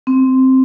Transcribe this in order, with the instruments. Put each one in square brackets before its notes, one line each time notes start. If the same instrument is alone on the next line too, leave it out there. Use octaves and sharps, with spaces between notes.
[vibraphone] C4